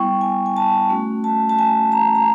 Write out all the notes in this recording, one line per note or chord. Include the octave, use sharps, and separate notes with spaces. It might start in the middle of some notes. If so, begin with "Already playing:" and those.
Already playing: G3 B3 E4 G5 C#6
G#5
G#5
A5
A3 C#4 F#4
A5
A5
G#5
A#5
A#5